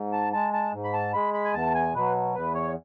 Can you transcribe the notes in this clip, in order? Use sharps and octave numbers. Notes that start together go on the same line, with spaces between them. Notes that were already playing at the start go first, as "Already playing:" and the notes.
Already playing: G#2
A5
G#3 A5
A5
G#2
B5
A5
G#3 B5
B5
G#5
E2 A5
G#5
B2 F#3 B4
E2 B4
C#5